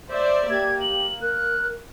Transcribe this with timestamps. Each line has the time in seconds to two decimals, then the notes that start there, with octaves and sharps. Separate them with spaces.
0.10 C5 D5 E5
0.50 A#3 G4 G#6
0.81 F#7
1.21 A#4 F#6